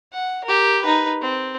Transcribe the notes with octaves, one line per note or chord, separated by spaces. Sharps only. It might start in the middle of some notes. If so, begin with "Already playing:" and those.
F#5
G4 A#4
D#4 B4
C4